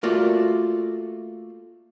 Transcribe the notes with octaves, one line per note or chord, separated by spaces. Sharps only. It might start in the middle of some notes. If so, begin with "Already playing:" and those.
A3 A#3 F4 F#4 D5